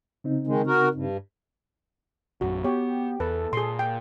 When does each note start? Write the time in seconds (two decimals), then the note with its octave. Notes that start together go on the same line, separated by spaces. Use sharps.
0.24 C#3 C4 D#4
0.47 D#3 G#3
0.67 F#4 A#4
0.94 G2
2.41 A#1 F#2 F#4
2.64 B3 G4 C#5
3.20 E2 A4 B4
3.53 A#2 G#4 C6
3.79 G5